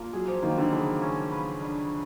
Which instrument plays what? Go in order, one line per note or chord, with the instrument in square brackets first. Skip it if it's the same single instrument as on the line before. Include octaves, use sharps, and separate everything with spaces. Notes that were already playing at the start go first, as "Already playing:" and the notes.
Already playing: [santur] A#3 D4 F4
[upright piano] F#3 [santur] G#4
[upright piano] F3
[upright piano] D#3 [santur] A#3
[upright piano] D3
[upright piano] C#3 [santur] A4
[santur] C#4
B4
D4